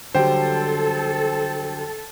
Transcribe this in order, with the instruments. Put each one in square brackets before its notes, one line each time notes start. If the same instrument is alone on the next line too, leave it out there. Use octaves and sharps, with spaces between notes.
[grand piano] D3 F#3 G3 [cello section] A4 [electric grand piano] C5 G5